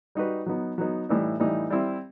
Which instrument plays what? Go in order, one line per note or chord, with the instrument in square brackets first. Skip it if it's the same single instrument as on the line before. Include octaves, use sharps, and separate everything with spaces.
[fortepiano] G3 D#4 F#4 B4
F#3 B3 D#4
F#3 B3 D#4
A2 E3 G3 D#4
A2 E3 G3 D#4
G3 C4 E4